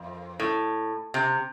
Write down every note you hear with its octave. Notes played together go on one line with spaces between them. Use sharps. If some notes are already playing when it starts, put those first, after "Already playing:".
Already playing: F2
A2
C3